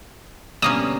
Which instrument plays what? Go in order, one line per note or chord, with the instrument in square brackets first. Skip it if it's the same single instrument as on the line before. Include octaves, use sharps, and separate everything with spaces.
[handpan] B2 D3 B3 [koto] G3 A#3 C#4 [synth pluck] D#6